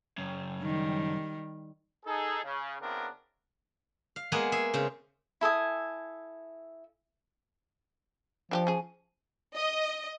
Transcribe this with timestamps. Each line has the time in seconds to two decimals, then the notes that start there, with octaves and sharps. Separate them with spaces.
0.18 F#2 C#3
0.61 D#3 G3
2.06 D#4 G#4 A4
2.44 C#3
2.82 C#3 B3 C4 D4 E4 A#4
4.16 F5
4.32 G#3 A#3 B3 G#4 B4 F#5
4.52 G#4 E5
4.74 C#3 C4
5.41 E4 A4 G#5 D#6
8.51 F3 D4 F#4 G4
8.67 C#3 G#4
9.56 D#5